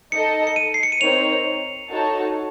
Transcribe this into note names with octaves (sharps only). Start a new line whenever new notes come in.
D#4 A4 D#5 C#7
C#7
D#7
C7
C#7
D#7
C4 D#4 A#4 C#5 F7
D#4 F#4 A4 C#5 A5